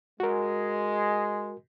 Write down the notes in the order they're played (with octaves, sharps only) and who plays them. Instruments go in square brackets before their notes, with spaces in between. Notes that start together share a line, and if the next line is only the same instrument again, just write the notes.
[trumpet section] G#3 [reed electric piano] F#4 A#4